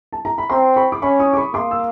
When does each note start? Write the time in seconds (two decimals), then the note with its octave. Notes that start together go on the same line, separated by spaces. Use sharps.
0.13 A5
0.25 A#5
0.38 B5
0.50 C4 A#5 C6
0.76 B5 C#6
0.92 D6
1.02 C#4 B5 C#6
1.19 C#6 D#6
1.33 D6
1.37 B5 C#6
1.54 A#3 C6 D6
1.71 E6